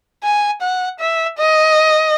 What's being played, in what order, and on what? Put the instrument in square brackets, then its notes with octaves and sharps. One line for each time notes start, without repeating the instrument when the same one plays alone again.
[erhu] G#5
F#5
E5
D#5